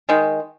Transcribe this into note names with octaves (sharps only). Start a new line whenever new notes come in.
D#3 G#3